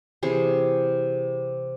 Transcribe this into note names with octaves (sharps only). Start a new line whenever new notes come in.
C3 E3 G#4